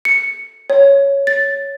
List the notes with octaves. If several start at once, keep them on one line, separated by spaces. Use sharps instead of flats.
C#7
C#5
A6